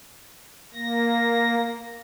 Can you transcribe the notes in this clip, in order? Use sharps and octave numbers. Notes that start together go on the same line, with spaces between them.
A#3 A#6